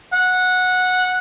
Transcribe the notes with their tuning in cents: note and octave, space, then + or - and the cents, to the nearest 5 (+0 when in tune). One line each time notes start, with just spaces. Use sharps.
F#5 -10